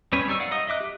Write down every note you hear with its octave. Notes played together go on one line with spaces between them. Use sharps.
G3 C4 C#4 B4 C#5
G3 D#4 D5 C#6 E6
D5 F5 F#5
D#4 D#5 D#6
D#5 E5 D6 F#6
G4